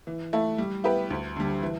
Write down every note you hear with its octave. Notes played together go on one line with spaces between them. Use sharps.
E3
A3 E4
G3
B3 E4 G4 B4
D2
D3 G3
E3